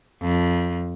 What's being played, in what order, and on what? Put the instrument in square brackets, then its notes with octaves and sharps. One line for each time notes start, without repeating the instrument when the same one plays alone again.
[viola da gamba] F2